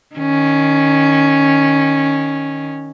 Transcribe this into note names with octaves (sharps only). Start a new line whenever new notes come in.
D#3 C#4